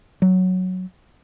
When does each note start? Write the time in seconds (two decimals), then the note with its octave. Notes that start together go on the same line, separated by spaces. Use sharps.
0.22 F#3